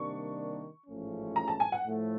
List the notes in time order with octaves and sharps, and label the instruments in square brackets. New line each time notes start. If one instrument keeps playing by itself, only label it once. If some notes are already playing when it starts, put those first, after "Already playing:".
Already playing: [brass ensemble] C3 D#3 G3 A#3 D4 [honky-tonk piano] C#6
[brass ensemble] A1 G#2 F3 A3 C#4
[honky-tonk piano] A#5
A5
G#5
F#5
[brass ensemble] A2 F3 A3